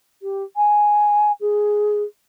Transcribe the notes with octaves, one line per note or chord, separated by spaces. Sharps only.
G4
G#5
G#4